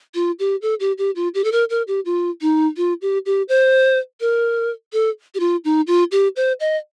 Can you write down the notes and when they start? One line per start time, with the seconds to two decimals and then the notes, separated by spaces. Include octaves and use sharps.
0.15 F4
0.39 G4
0.62 A4
0.80 G4
0.98 G4
1.16 F4
1.34 G4
1.44 A4
1.52 A#4
1.70 A#4
1.88 G4
2.05 F4
2.41 D#4
2.77 F4
3.02 G4
3.26 G4
3.49 C5
4.21 A#4
4.93 A4
5.35 G4
5.40 F4
5.64 D#4
5.87 F4
6.11 G4
6.36 C5
6.60 D#5